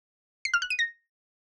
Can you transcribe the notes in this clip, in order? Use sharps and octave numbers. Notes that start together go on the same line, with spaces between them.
C7
F6
F#6
D#7
A#6